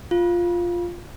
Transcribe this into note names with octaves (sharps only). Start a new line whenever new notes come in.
F4